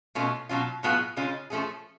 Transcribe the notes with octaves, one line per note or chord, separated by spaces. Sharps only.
B2 A3 C#4 F4
B2 F#3 C#4 F4
A2 F#3 B3 F4 G#4
C#3 G#3 C#4 F4
F3 A3 C#4 G#4